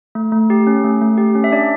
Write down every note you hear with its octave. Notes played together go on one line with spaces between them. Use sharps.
A3
A3
G4
C#4
A3
A3
G4
C#4
E5
D4 D5